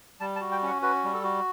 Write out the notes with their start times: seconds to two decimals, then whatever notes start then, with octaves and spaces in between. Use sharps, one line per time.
0.20 G3 A5
0.36 A5
0.41 F#4
0.52 G5
0.63 C#4 F#5
0.82 F#4 B4
1.04 G3
1.14 A4
1.24 F#4